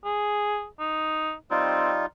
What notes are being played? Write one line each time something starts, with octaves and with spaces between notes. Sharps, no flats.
G#4
D#4
G3 C4 D#4 F4